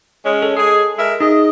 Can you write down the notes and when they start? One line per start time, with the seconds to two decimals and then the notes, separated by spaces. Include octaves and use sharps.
0.24 G#3 C#4
0.42 A4
0.57 G#3 G#4
0.98 G#3 A#4 E5
1.20 D#4 G#4 D#5